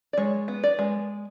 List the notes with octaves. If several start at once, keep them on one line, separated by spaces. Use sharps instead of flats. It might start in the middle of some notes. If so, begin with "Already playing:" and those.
D5
G#3 C#5
B3
D5
G#3